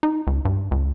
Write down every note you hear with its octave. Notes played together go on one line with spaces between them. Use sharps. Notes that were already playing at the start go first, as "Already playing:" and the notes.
D#4
C#2
G2
C#2